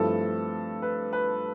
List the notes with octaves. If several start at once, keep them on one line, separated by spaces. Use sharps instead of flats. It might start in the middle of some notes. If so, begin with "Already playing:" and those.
Already playing: G2 F3 A3 C4 E4 A4
B4
B4